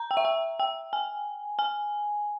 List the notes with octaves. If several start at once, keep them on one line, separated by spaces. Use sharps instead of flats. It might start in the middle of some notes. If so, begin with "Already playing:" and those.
Already playing: A#5
G5
E5
G5
G5
G#5
G#5